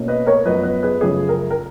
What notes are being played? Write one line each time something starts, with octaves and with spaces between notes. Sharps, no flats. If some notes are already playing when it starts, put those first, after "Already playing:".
Already playing: B2 A#3 C#4
B4 D#5
A#4 C#5
F#2 F3 B3 B4 D#5
B4 D#5
G#4 B4
F#2 C#3 F3 G#4
A#4
A#4